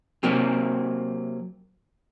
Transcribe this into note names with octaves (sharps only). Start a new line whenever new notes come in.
C3 F#3 A#3 C4